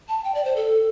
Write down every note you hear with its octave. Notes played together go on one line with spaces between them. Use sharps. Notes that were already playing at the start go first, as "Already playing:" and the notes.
A5
G5
D5
C5
A4